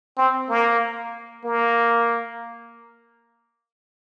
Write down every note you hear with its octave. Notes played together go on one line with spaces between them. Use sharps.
C4
A#3
A#3